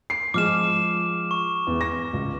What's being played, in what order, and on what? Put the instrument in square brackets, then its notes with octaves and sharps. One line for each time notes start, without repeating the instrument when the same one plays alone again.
[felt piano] C7
[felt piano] F3 G#3 [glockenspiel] D6 F6 E7
[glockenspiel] C#6
[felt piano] E2
A#6
C#2